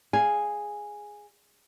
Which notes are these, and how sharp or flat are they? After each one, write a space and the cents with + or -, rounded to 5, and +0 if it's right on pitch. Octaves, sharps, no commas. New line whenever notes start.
G#4 +0 F5 +0 G#5 -5